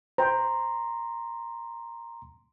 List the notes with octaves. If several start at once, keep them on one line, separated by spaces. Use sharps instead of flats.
C5 G5 A#5 C6